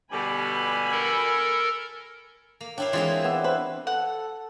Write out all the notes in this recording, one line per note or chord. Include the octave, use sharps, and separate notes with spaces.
B2 D3 G3 G#5 B5
A4 A#4
A#3
D4 E4 C#5 F5 G5
E3 G#3 C4 E4 F4 G#4
B3 D5 E5
B4 C5
A4 F#5